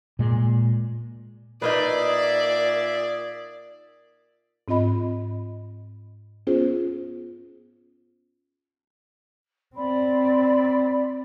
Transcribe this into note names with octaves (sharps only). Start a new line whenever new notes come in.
A#2 G#3
A#2 D#4 F4 G#4 B4 D5 E5
G#2 C4 F4 D#5 B5
B3 C#4 F4 G#4 C5
C4 D5 B5